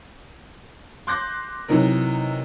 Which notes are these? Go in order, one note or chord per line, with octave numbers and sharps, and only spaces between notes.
C6 D6 F#6 G6 A#6
C3 E3 F#3 D#4 A#4